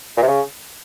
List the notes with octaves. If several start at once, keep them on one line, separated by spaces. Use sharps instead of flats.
A#2
C3
C#3